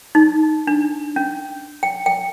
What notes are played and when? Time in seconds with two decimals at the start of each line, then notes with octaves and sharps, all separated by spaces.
0.15 D#4
0.67 D4
1.16 C#4
1.83 G5
2.06 G5